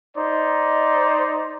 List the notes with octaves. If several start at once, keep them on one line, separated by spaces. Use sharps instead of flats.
D#4 C5 D5